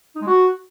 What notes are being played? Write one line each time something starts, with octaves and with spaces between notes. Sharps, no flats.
D#4
G#3
F#4